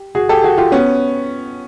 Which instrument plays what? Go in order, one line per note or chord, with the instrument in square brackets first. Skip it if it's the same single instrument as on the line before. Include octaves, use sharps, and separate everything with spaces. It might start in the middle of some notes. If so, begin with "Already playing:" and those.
Already playing: [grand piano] G4
F#4 G#4
G4 A4
F#4 G#4
F4 G4
B3 C#4